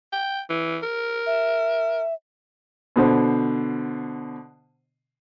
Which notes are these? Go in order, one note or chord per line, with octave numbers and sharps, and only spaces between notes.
G5
E3
A#4
E5
B2 D3 C5